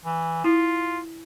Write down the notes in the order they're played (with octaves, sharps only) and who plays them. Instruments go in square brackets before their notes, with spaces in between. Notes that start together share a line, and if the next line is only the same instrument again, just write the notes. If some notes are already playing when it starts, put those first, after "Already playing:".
[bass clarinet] E3
[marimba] E4 [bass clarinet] F4